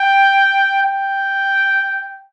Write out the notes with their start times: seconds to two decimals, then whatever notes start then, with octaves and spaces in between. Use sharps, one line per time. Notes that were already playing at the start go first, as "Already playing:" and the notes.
Already playing: G5
0.83 G5